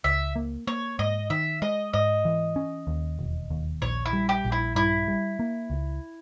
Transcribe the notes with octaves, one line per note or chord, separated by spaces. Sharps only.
C#2 E5
A#3
A#3 C#5
G#2 D#5
D#3 E5
G#3 D#5
G#2 D#5
E3
C#4
D#2
E1
D#2
A#1 C#5
E4
G3
G4
A#1
E4
G2 E4
G3
A#3
C#2